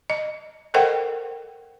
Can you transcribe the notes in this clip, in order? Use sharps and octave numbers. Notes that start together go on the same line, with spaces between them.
D#5
A4 A#4 C5 D#5 F#5 G5